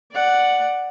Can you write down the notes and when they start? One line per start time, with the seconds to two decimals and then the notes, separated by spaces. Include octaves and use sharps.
0.12 D5 F#5